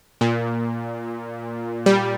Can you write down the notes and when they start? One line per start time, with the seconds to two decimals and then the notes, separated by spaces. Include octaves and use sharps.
0.21 A#2
1.86 G3